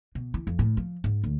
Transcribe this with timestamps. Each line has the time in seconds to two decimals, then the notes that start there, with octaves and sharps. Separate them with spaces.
0.15 B2
0.34 E3
0.47 F2
0.59 A2
0.77 F3
1.04 G#2
1.24 D2